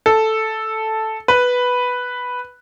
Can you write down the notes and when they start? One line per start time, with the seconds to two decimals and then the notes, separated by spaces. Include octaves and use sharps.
0.06 A4
1.28 B4